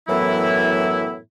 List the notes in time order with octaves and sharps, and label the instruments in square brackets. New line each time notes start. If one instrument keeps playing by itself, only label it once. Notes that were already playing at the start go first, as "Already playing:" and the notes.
[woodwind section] F#2 A2 E3 F#3 B3 E4